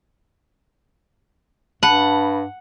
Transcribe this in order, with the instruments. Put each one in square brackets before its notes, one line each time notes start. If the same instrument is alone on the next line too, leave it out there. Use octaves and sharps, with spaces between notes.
[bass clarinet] G2 [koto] F#5 [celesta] A5 B5